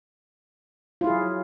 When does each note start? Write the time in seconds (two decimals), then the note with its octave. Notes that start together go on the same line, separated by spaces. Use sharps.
1.01 F4
1.04 E4
1.07 G#4
1.10 F#3